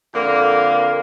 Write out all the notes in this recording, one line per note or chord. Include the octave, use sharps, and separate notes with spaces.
F2 D3 A#3